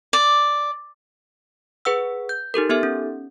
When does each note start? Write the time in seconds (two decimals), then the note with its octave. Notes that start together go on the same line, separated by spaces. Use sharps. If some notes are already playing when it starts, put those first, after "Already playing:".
0.13 D5
1.85 G#4 B4 F#5 E6
2.29 G6
2.54 D#4 G4 A4 A#4
2.69 B3 D#4 G4 A4 E5
2.83 C#4